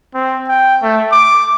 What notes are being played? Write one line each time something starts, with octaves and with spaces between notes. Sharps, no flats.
C4
G5
A3
D6